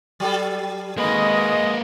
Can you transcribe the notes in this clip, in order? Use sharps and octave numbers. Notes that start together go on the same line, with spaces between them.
F#3 G3 A4
B2 D#3 G#3 A#3 B4 D#5